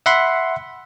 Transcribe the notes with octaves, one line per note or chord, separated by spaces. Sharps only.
E5 F#5 B5 C6